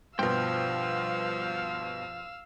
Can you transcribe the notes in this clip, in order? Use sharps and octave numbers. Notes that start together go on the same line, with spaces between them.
G2 B2 F3 C5 F5 G5 E6